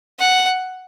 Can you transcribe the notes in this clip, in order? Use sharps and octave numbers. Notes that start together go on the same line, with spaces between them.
F#5